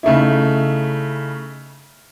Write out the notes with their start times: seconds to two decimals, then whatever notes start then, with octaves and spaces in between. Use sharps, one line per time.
0.03 C#3 A3 D#4 E4